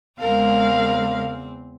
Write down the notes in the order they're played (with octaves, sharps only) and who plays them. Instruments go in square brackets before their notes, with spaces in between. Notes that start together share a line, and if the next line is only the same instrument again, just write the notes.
[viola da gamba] E2 C4 [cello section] C#3 G#3 [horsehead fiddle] A#4 [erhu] F5